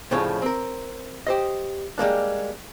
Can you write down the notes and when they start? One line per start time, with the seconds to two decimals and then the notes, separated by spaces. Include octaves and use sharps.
0.11 C2 A2 C#3 F3 C#5 G#5
0.42 C4 A#4
1.27 G4 C5 D#5
1.98 G3 G#3 A#3 D4